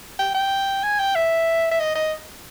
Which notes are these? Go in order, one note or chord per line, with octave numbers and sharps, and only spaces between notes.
G5
G5
G#5
G5
E5
E5
D#5
D#5